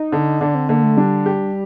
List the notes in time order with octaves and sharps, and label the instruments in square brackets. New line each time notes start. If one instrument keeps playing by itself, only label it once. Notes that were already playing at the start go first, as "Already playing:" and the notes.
Already playing: [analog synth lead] D#4
[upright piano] D3
[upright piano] D3 [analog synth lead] D4
[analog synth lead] C4
[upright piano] D3 [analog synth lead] A#3
[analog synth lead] A3
[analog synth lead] G3 [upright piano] D4
[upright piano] G4